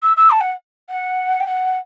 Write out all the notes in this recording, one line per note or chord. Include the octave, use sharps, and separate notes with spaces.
E6
E6
A5
F#5
F#5
G5
F#5